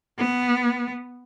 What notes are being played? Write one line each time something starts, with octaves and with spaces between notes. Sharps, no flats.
B3